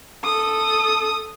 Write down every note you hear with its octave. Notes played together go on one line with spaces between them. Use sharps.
A4 D#6